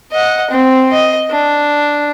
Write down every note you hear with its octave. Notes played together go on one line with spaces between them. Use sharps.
D#5 F#5
C4
D#5
D4